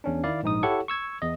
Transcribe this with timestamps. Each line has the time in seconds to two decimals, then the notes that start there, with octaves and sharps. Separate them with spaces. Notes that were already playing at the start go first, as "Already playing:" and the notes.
0.04 E2 C#4 D4
0.24 D#3 E4 D5 F5
0.43 A#1 G#2 D#4 D#6
0.63 E4 G4 A4 C#5 F#5 C#6
0.88 C#6 E6 G#6
1.22 E2 D#5